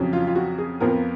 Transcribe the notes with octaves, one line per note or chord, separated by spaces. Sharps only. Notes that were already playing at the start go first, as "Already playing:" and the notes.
Already playing: F2 C#3 F#3
F4
F4
F#4
G#4
F2 F3 B3 A#4